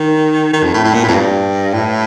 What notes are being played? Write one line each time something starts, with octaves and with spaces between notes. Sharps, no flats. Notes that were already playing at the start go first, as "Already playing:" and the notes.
Already playing: D#3
D#3
F2
A2
A2
A#2
A2
F2
G2
A2